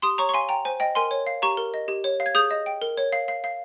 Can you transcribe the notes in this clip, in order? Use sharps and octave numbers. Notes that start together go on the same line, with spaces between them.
G4 C6 D#6
C#5 A#5 C#6
C#6
F5 G#5 C6
G5 A#5
C5 G#5
D#5 G5
A#4 G#5 C6
C#5
F5
G4 A#5 C#6
A#4
D#5
G4
C#5
F5
G#6
G#4 D#6 G6
D#5
G5
A#4
C#5
F5
F5
F5